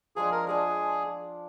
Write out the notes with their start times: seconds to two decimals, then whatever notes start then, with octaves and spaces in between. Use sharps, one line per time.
0.16 F3 G#3 D4 G#4
0.31 A#4
0.47 F3 G#3 D4 G#4